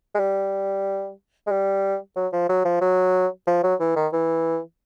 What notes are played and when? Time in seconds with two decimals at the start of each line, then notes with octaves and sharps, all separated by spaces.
0.14 G#3
0.19 G3
1.47 G#3
1.51 G3
2.16 F#3
2.32 F3
2.49 F#3
2.65 F3
2.81 F#3
3.47 F3
3.63 F#3
3.80 E3
3.96 D#3
4.13 E3